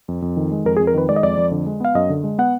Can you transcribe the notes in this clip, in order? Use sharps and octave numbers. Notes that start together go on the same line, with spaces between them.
F2
F2
D#3
G#3
F2 A#4
G#4
F2
A#4
D#3 B4
G#3 D5
D#5
F2 D5
F2
D3
G#3
B3 F5
F#2 D#5
D3
G#3
B3 F#5